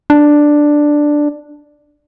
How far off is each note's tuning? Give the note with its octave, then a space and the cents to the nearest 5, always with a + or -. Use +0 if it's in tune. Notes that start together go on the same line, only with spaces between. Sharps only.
D4 +5